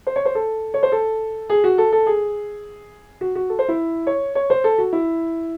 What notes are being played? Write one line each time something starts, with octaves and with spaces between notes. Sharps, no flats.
C5
C#5
C5
A4
C#5
C5
A4
G#4
F#4
A4
A4
G#4
F#4
F#4
A4
C5
E4
C#5
C#5
C5
A4
F#4
E4